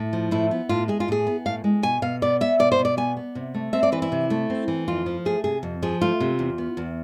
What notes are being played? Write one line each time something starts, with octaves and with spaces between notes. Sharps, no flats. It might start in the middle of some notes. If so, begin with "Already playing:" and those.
Already playing: A2
F3
A2 E4
B3
A2 F4
G#3 G#4
F4
A2 G#4
B3
A2 F5
G#3
B2 G#5
B2 F5
B3 D5
B3 E5
B2 D5
C5
B2
D5
B3 G#5
B3
C3
A3
C4 E5
D5
E3 B4
E4
C3
A3
C4
E3
F2 F4
F3
A3 G#4
C3 G#4
F2
F3 G#4
A3 F4
C3
E2
B3
E2